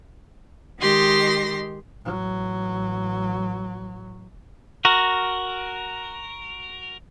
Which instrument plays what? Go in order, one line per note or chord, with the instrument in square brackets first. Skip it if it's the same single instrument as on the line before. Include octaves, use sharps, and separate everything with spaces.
[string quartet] D#3 G#3 G4 C6 A#6
[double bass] A1 F#3
[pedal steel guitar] F#4 A#4